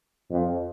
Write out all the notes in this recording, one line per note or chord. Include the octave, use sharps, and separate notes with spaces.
F2